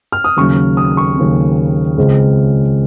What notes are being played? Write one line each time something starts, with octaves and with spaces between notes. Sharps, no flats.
F6
D#6
D#2 C#3 F#3 C#4 C#6
D#6
C#6
D#2 C#3 F#3 C#4
C#2 C#3 G#3 C4